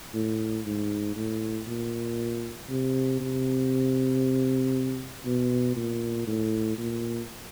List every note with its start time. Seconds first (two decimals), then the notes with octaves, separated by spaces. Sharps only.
0.14 A2
0.66 G#2
1.16 A2
1.67 A#2
2.70 C3
3.20 C3
5.25 B2
5.76 A#2
6.27 A2
6.78 A#2